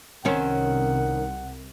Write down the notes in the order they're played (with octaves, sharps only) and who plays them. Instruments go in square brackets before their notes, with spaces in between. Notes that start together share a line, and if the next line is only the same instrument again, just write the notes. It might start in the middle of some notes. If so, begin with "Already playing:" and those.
[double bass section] C2 [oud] D#3 C4 C#4 [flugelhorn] F#5